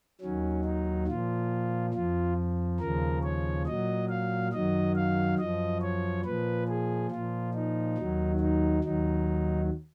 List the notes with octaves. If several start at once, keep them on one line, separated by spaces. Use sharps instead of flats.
D#2 D#3 F#3 C#4
D#4
A#2 F3 F4
F2 F3 F4
D#2 C#3 F3 A#4
C#5
A#2 F#3 D#5
F5
F#2 D#3 F#3 D#5
F5
F#2 F3 D#5
C#5
A#2 F3 B4
G#4
A#2 F3 F4
D#4
D#2 D#3 F#3
D#4
D#2 D#3 F#3 D#4